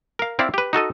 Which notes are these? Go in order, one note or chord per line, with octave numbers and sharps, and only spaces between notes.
A#4 F5
C4 E4 D5 F5
G4 B4
D#4 F#4 A4 D#5